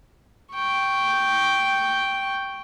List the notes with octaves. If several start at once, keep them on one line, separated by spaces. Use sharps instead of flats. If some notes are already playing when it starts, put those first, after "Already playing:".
G5 C#6